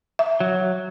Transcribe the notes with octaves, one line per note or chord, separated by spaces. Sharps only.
E5
F#3